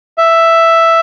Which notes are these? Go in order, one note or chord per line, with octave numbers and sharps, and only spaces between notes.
E5